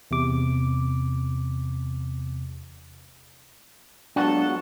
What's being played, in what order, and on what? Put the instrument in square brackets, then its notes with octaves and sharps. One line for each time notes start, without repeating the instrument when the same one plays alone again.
[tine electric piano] E2 C3 D6
[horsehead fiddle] F#3 G#3 [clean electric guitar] B3 F4 F#4 [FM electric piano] D4 [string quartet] A4 A5